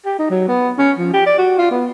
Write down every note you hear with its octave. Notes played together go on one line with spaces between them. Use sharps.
G4
D#4
F#3
B3
C#4
F3
G4
D5
F#4
F4
B3